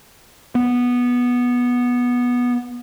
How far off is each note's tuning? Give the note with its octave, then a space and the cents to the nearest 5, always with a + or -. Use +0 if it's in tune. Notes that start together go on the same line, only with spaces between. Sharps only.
B3 -10